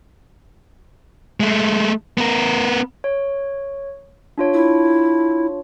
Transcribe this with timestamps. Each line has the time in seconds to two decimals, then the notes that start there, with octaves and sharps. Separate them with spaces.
1.40 G#3 A3
2.18 B3 A#4
3.04 C#5
4.38 D4 F4 C#5
4.54 E4